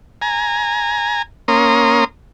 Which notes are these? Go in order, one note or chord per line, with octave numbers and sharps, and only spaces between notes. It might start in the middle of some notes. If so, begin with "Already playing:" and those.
G#5 A#5
A#3 C#4 A#5 C6 D#6